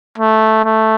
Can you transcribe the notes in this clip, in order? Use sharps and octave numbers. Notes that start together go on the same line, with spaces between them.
A3
A3